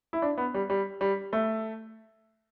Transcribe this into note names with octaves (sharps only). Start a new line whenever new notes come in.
E4
D4
B3
G3
G3
G3
A3